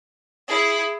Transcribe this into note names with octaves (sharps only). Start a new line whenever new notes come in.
E4 G#4